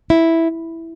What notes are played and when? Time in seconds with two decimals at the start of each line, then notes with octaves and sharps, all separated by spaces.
0.10 E4